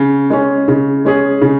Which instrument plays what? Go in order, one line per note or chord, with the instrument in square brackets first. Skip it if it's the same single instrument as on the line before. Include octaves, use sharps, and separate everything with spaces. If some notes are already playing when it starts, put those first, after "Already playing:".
Already playing: [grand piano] C#3
G#3 C#4
C#3
G#3 C#4 G#4
C#3